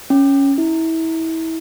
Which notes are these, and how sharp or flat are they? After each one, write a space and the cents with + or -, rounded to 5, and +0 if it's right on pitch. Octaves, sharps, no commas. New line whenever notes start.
C#4 +0
E4 -25